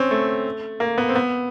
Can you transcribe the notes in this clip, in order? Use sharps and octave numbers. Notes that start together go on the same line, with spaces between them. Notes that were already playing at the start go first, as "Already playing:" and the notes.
Already playing: C4 C#4
A3
A#3
B3
C4
B3